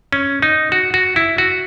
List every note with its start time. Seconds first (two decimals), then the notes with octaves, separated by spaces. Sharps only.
0.13 C#4
0.42 D#4
0.72 F#4
0.94 F#4
1.16 E4
1.38 F#4